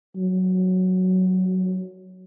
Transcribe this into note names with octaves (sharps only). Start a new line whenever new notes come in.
F#3